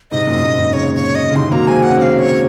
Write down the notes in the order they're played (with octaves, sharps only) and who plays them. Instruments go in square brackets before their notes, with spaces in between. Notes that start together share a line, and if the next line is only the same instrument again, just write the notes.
[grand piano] G#2 C3 [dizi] D#5
[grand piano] F#2 A#2
F#2 A#2
G#2 C3
[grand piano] A#2 C#3 [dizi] C#5
[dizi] C#5
D#5
[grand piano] C#3
[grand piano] C3 D#3 [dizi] C6
[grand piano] F#3 A#3 [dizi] A#5
[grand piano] G#3 C4 [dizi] G#5
[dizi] F#5
[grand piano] C#4
[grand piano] G#3 C4 [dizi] F#5
[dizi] F5
C#5